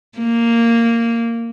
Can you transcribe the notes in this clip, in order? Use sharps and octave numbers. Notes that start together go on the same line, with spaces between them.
A#3